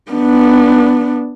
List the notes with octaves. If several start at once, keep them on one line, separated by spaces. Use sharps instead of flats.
B3 D4